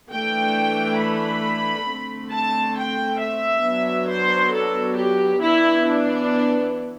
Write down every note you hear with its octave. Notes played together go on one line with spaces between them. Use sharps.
E3 A3 D4 G5
B5
D3 A3 C4
A5
G5
E5
F#3 B3 D4
C5
A4
G4
E3 B3 D4 E4
D4